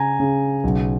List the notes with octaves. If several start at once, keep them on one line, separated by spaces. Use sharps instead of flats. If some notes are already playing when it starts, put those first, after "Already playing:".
Already playing: C#3 G#5 A#5
C#3
B1